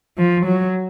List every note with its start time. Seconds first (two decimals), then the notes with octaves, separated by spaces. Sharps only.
0.18 F3
0.46 F#3